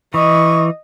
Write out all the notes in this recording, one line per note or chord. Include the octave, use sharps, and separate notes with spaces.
E3 D#5 C#6